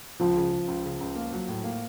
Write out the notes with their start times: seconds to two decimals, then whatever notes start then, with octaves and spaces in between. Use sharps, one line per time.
0.20 C#2 F3
0.37 C#3
0.52 C#3
0.68 C#2
0.85 C#3
1.01 C#2
1.16 A#3
1.33 F#3
1.48 A2
1.64 A#3